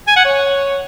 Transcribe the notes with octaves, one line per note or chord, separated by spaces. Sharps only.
G#5
F#5
C#5